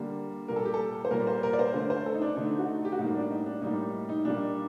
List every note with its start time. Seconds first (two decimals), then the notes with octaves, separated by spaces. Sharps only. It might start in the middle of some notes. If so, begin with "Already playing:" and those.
Already playing: D3 G3 A#3
0.48 A#2 G3 A#3 A#4
0.56 A4
0.65 G4
0.74 A4
1.05 C5
1.11 A#2 G3 A#3 A#4
1.27 C5
1.43 A#4
1.53 D5
1.59 C5
1.74 D3 A3 C5
1.90 C5
2.06 A4
2.14 D#4
2.22 D4
2.36 D3 A3 D#4
2.59 F#4
2.68 D#4
2.85 G4
2.92 F#4
2.99 A2 G3 A#3 D#4
3.15 D4
3.31 D#4
3.46 D4
3.62 A2 G3 A#3 D#4
4.09 D#4
4.25 A#2 G3 A#3 D4